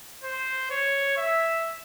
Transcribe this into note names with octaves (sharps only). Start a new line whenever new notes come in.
C5
C#5
E5